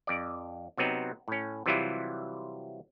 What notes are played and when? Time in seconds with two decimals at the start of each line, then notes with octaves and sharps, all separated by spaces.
0.07 F2 D5
0.78 C3 F#3 B3 C4 D#4
1.28 A2 C#4
1.66 C3 E3 F#3 G3 E4 F4